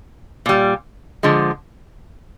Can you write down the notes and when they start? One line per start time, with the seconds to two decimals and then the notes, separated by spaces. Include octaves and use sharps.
0.46 A#2 G3
1.23 D3 F3 G#3